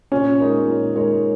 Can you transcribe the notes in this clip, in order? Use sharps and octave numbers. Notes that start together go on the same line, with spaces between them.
A#2 C#4
G#3 D#4 A#4 C#5
A#2
G#3 D#4 A#4 C#5